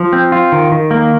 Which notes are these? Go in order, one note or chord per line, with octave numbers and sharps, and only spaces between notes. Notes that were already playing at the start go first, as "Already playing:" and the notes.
Already playing: F3
C4
F4
D#3
D#3
A#3